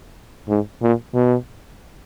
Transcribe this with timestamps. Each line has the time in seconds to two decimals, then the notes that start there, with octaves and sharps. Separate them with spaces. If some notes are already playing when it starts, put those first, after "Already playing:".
0.48 G#2
0.82 A#2
1.15 B2